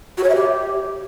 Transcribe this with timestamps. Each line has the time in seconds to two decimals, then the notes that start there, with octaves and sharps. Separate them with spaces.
0.18 F#4
0.24 C#5
0.30 E5
0.35 G4